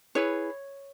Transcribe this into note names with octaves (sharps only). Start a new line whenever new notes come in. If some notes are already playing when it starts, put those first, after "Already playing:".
E4 G#4 B4 C#5